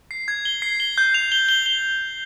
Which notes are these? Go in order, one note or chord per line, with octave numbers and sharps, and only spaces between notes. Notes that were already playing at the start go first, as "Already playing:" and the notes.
C7
G#6
G7
C7
G7
G6
F7
G7
G7
G7